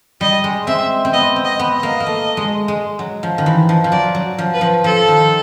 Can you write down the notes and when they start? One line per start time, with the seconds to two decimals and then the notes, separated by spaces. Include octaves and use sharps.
0.21 G3 D#5
0.44 G#3
0.67 C4 E5
1.05 C4
1.13 B3 D#5
1.36 C4
1.45 D#5
1.59 B3
1.75 D#5
1.83 A#3
2.00 A#3
2.06 A3
2.37 G#3
2.68 G#3
2.99 F#3
3.23 F3
3.38 D#3
3.46 E3
3.69 F3
3.84 F3
3.92 F#3 D5
4.15 F#3
4.38 F3
4.54 B4
4.61 F3
4.84 F3 A4
5.08 D#3